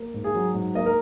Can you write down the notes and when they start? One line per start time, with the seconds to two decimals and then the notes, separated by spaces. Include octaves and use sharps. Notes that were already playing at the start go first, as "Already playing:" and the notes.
Already playing: A#3
0.14 G#2
0.24 G#4
0.35 F#3
0.54 G#2
0.75 A#3 D#5
0.86 A#4